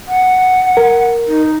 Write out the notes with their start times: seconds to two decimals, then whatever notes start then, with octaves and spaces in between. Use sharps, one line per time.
0.08 F#5
0.77 A#4
1.27 D#4